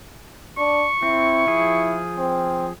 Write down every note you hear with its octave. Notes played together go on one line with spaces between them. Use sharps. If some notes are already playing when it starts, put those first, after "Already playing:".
D4 C#6
C4 E4
F3 G#4
C4